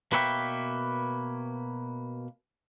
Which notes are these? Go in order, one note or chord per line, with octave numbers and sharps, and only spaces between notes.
B2 A#3 B4 C#5 E5 G5